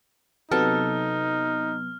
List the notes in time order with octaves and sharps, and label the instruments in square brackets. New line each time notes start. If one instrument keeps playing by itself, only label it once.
[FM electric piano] C3 F#3 B3 [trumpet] D#4 [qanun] A4 [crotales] F6